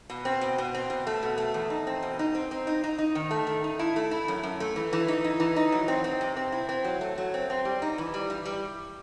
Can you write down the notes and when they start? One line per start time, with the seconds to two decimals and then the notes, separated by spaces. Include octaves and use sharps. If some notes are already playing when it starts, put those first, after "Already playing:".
0.10 B2
0.25 C4
0.41 B2
0.58 B2
0.75 C4
0.90 B2
1.07 A3
1.23 B2
1.38 A3
1.54 E2
1.70 D#4
1.87 C4
2.03 B2
2.19 D#4
2.35 C4
2.51 C4
2.67 D#4
2.84 D#4
2.99 D#4
3.15 D#3
3.31 A3
3.47 D#3
3.64 D#4
3.79 E4
3.96 A3
4.11 E4
4.28 F#2
4.43 F#2
4.60 A3
4.76 E3
4.93 E3
5.08 D#4
5.24 D#4
5.40 E3
5.56 D#4
5.72 F#3
5.88 C4
6.04 C4
6.21 C3
6.37 C4
6.52 E4
6.69 C4
6.85 F#3
7.01 A3
7.18 F#3
7.34 C4
7.50 C4
7.65 G3
7.82 D#4
7.98 E3
8.14 G3
8.30 E3
8.45 G3